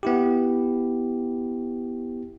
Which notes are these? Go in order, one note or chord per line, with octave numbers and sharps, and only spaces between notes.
B3 E4 G4